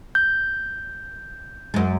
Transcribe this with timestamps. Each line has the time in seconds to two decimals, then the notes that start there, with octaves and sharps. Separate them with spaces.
0.15 G6
1.74 F#2 G#3